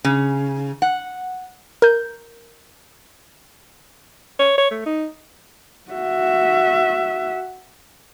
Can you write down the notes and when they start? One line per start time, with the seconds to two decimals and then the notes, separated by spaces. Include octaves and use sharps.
0.05 C#3
0.82 F#5
1.82 A#4 G6
4.39 C#5
4.58 C#5
4.71 A3
4.86 D#4
5.91 F#4 E5